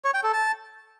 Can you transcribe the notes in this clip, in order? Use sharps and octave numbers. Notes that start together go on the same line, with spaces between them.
C#5
G5
A4
A5